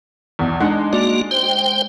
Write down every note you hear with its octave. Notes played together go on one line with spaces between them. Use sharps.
B1 E2
G#3 D4 D#4 F#5
A#3 F#4 D5
C5 G5